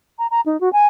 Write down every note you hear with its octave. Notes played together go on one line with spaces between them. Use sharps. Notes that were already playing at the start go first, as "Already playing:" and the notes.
A#5
A#5
D#4
F#4
G#5